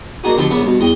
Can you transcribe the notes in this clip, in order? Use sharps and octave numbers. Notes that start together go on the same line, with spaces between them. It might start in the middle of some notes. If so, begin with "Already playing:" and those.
A#3 D4 D#4 F#4 G#4
B2 D3 F3 D4 G4 A4
A#1 C#3 B3 E5 B5
G2 B2
E2 D#5 G5